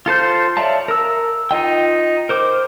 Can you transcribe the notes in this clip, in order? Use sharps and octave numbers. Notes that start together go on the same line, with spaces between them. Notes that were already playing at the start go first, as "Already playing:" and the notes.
F4 A4 C5 G6
C#5 D5 E5 F5 A5
A#4 E6
D#4 F4 D#5 G5
A#4 C5 D6